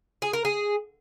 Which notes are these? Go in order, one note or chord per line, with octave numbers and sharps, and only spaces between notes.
G#4
A#4
G#4